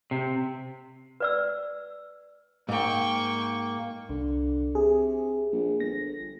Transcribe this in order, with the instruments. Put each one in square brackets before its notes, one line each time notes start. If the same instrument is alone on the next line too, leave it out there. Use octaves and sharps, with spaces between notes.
[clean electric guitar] C3
[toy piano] B4 D5 E6
[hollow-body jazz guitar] G#2 [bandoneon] A#3 [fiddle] G5 C#6
[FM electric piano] C2 [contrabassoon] D3
[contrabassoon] C3 [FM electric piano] G#4
[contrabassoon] A#1
[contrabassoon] G1 [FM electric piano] A#6